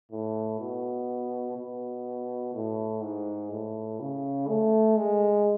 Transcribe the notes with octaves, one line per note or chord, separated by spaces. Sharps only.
A2
B2
B2
A2
G#2
A2
C#3
A3
G#3